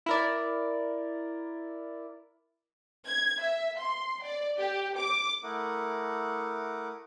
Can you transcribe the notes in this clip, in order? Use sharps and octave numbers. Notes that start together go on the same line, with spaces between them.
E4 A#4 D5
G#6
E5
C6
D5
G4
D6
A3 E4 A#4 F#5 D6 D#6